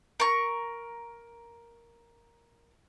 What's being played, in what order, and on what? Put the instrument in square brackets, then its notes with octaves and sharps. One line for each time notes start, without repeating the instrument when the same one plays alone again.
[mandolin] A#4 C#6